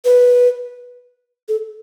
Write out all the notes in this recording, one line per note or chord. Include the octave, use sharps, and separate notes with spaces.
B4
A4